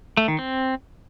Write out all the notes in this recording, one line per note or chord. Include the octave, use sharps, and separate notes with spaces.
A3
D#3
C4